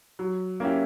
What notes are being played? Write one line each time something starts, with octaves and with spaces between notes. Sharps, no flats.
F#3
A#3 C#4 E4 G4